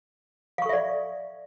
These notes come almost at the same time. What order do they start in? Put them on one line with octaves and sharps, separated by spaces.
F5 C#6 A4 E5 D5